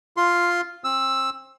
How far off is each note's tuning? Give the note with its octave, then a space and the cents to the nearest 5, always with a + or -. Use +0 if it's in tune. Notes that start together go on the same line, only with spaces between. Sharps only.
F4 +0 C6 +0
C4 +30 E6 +0